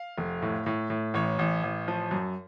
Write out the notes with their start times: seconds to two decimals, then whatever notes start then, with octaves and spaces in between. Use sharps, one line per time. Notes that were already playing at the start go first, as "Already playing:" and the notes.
Already playing: F5
0.18 F1
0.42 A2
0.66 A2
0.90 A2
1.14 A1 C#5
1.39 A1
1.63 A1
1.88 F3
2.11 F#2